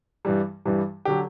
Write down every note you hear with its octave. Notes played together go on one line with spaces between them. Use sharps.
G2 E3 G3
G2 E3 G3
D3 F#3 G4